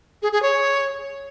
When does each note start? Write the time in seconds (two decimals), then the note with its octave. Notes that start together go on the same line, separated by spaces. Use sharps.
0.22 G#4
0.32 G#4
0.42 C#5